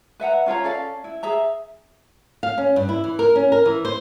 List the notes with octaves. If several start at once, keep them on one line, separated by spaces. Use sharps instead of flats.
B4 E5 F#5 A#5
C#4 F4 C#5 A#5
C#4 A4 D5 F5
E4
G#4 E5 A#5
F5
C#4
G2
E4
E3
A#4
C#4
A#4
E3
C5